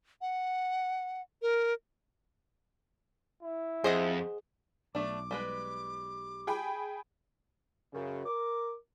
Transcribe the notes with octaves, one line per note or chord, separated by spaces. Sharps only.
F#5
A#4
E4
F2 G#4 C5 D#5 F#5
B1 A3 D4 D6
G3 G#3 B4
G#4 G5 B5
F#2 C#3
A#4 D6